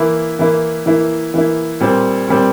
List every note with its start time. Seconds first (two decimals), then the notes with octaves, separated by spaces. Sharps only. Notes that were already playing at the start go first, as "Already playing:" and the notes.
Already playing: E3 A#3 E4
0.39 E3 A#3 E4
0.86 E3 A#3 E4
1.34 E3 A#3 E4
1.80 A#2 G3 C4
2.28 A#2 G3 C4